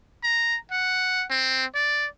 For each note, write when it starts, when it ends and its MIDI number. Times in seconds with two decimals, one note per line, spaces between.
0.23 0.57 82
0.71 1.25 78
1.30 1.65 60
1.75 2.06 74